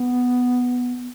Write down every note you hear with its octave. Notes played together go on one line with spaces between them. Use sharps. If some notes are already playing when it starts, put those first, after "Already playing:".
Already playing: B3